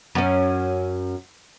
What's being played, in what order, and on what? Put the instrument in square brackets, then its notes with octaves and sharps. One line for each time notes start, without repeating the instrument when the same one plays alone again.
[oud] F#2 C#4